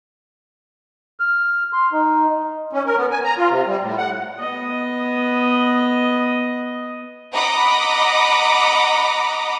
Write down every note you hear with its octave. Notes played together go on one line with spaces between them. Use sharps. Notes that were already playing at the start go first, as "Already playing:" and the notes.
F6
C6
D#4
C#4
A#4
B3
G#5
A#5
F4
C3
G3
A2
F#5
B3 D#5
D#5 F#5 A#5 B5 D6 D#6